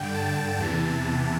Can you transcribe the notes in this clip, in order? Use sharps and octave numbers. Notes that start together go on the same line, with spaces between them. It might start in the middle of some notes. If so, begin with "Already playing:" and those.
Already playing: G2 D3 G5
A5
E2 C3 E3 A5